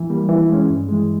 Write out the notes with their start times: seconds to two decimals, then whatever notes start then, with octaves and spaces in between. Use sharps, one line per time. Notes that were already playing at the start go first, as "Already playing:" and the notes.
Already playing: E3
0.10 G3 A#3
0.29 E3
0.49 G#3 C#4
0.69 G2
0.89 E3 G#3